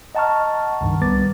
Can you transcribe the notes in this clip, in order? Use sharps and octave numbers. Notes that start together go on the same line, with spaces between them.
D#5 F#5 A5 A#5 C#6 F6
C#2 G2 D#3
C2 G3 B3 B4 D6 A6